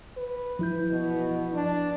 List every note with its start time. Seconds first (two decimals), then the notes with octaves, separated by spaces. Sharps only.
0.17 B4
0.59 F3 E4 G6
0.91 B2
1.53 D4